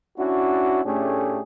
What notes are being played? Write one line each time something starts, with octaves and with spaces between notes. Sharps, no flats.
C#4 D4 E4 F#4
A2 A3 C#4 D4 G4 G#4